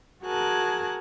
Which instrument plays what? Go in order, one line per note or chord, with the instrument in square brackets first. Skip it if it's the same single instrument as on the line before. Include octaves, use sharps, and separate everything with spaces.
[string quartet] F#4 G#4 A#4 G#5 A5 F#6